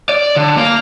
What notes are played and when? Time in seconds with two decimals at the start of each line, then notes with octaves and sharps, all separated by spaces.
0.09 D5
0.36 D3
0.56 A#3